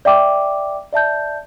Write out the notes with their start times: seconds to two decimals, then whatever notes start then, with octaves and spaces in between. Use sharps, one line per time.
0.05 D5 E5 G5 D6
0.93 D5 E5 A5 G6